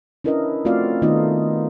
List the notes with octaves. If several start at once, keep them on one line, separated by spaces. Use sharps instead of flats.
C#4 D4 E4 A#4 B4 D#5
A3 C4 F4 F#4 D5 F5
D#3 A3 B3 D#4 F4 D#5